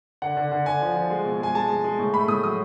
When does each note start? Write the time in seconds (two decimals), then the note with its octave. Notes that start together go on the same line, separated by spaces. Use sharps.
0.22 D3 F#5
0.37 D3
0.52 D3
0.66 D3 G#5
0.81 F3
0.96 F3
1.10 G#3
1.25 B2
1.40 G#3 G#5
1.55 G#3 A5
1.70 G#3
1.84 G#3
1.99 A2
2.14 A3 B5
2.28 A2 D#6
2.43 F#3 D#6